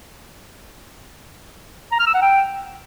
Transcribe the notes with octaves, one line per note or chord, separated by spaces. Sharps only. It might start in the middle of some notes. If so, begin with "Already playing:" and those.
A#5
F6
E6
F#5
G5